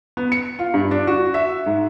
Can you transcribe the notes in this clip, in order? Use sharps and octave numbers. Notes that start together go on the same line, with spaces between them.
B3
C#7
F4
G2
D4
F#4
E5
G#2